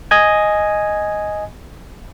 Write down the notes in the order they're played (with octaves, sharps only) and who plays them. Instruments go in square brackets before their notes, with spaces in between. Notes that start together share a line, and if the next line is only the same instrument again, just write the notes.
[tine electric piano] D#5 G#5 G#6